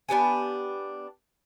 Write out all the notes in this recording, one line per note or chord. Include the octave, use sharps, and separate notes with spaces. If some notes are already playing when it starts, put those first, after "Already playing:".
B3 D4 G4 G#5